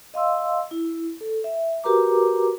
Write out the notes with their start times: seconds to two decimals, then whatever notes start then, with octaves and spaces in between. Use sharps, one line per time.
0.14 D#5 F5 C6 E6
0.71 E4
1.21 A4
1.44 E5
1.84 F#4 G4 A#4 B4 A#5 D6